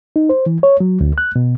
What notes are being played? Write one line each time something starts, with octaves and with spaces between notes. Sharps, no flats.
D#4
C5
E3
C#5
F#3
D2
F#6
B2